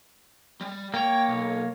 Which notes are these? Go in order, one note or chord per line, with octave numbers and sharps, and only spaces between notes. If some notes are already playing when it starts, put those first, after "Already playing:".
G3
A#3 C#5 G5
B1